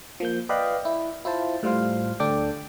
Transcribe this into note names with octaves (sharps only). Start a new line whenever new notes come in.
F3 A#3 G6
B4 D5 D#5 F5 G5 B5
E4
E4 F4 C5 A5
A2 G3 F4 C5 F5
D2 D4 A4 D5 G5 D6